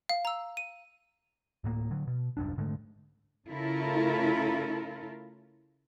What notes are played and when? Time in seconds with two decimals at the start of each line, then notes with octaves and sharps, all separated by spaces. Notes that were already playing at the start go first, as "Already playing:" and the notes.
0.09 F5
0.25 A#5 E6
0.57 D#7
1.64 D1 A2 A#3
1.91 D3 F#3
2.07 B2
2.37 D#1 C2 F#2 D4
2.58 G#2 D3 G#3 A3
3.48 C#3 A3 E4 F4 A4 A#4